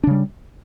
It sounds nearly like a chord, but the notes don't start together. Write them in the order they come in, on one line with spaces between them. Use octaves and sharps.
D4 C#3 G3